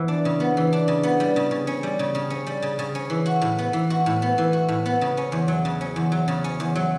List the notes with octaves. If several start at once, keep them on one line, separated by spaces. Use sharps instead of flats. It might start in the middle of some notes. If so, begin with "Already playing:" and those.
Already playing: E3 B3
D4
C#3
B3
E3
D4
C#3
B3
G3
C#3
C#3
C#4
G3
C#3
C#3
C#4
G3
C#3
C#3
C#4
E3
F#4
A2
B3
E3
F#4
A2
B3
E3
F#4
A2
B3
C#3
C#4
E2
F#3
C#3
C#4
E2
F#3
C#3
C#4
E2
F#3